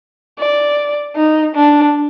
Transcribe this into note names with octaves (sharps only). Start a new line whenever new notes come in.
D5
D#4
D4